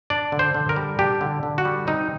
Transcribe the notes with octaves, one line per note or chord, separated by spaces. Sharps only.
D4 D5
D3
C5
D3
A#4
G3
D4 G4
D3
D3
F#4
G3
C4 D#4